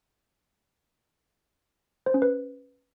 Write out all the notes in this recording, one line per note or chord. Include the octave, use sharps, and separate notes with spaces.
C5
C#4
B4